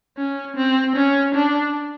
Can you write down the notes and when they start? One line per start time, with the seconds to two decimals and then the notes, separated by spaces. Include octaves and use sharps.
0.17 C#4
0.56 C4
0.95 C#4
1.35 D4